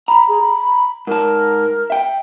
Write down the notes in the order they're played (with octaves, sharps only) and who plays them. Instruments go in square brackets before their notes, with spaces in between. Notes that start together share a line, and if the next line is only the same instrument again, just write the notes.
[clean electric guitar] A#5 [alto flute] B5
[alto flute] G#4
B5
[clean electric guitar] G#2 A5 [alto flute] A#4
[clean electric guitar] E5 G5